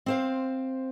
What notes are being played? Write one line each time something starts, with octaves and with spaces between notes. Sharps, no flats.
C4 C5 F5